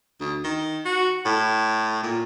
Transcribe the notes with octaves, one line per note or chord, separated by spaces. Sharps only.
D2
D#3
F#4
A2
A#2